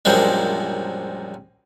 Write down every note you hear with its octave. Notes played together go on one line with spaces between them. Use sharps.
A#1 F#2 A#2 F3 G3 G#3